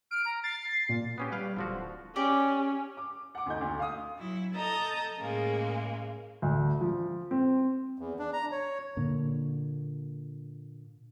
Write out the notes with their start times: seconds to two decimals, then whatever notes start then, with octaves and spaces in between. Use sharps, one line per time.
0.11 F6 D7
0.25 A#5
0.44 A6 C7
0.89 A#2
1.18 B3 C#4 G4
1.32 G3 B4 F5 G5
1.57 D1 D3 F3 F#4
2.16 C#4 G4 D5 D6
2.97 D6
3.35 F#5 D6
3.46 D2 D#4 G6
3.61 D2
3.79 F5 D#6
4.19 F#3 E4
4.55 A4 D#5 A5 A#5 D#6 G6
5.19 A2 C#3 G#3 A#3
6.42 D2
6.81 F3
7.31 C4
7.98 E2
8.19 D4
8.33 A#5
8.52 C#5
8.97 A#2 D3 A#3